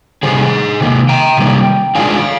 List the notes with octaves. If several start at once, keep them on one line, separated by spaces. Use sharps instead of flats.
C3 D#3 G3 G#4 C5
C3 D#3 A#3
G5 A#5
C3 D#3 G3 A#3
D#3 G#3 D4 F4 F5 G#5